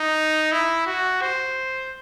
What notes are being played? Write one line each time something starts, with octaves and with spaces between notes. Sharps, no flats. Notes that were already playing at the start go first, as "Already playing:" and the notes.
Already playing: D#4
E4
F#4
C5